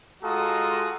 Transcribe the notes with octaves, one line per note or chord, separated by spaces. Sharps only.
G#3 F4 F#4 A4 A#5 D#6